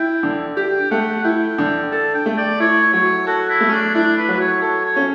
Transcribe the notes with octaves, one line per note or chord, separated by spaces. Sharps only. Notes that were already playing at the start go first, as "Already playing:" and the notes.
Already playing: E4 G5
D3
G4 G5
A3 F#5
E4 G5
D3
A4 A5
G5
A3
D5
E4 C#5
F#3 C#5
F#4 A4
E4
A3
C#4
D4
D4 E4
B4
F#3 B4
C#5
A4 C#5
C#5
C#4